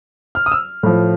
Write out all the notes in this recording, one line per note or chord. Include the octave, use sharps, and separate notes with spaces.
F6
D#6
E6
A2 F3